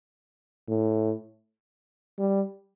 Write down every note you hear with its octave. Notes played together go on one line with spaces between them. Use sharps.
A2
G3